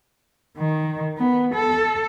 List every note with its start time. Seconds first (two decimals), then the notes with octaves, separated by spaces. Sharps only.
0.58 D#3
1.18 B3
1.55 A4